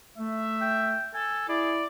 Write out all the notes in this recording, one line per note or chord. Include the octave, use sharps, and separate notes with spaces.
A3 E5
G5
A4 G#5
E4 G#4 D5